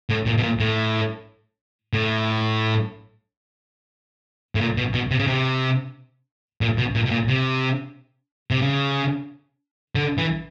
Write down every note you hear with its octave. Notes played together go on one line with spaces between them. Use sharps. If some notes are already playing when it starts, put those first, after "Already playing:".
A2
A#2
B2
A#2
A2
A2
A2
A#2
B2
B2
C3
C#3
C3
A#2
B2
A#2
B2
A#2
C3
C3
C#3
D3
E3